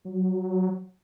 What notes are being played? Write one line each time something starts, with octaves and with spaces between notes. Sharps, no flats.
F#3